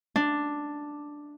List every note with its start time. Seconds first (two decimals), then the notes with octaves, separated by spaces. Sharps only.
0.16 D4